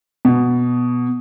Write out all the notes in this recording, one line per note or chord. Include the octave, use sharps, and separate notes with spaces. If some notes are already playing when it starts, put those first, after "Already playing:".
B2